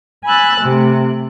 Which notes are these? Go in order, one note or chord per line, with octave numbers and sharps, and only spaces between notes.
G#5 B5 E6 F#6 A6
C3 A3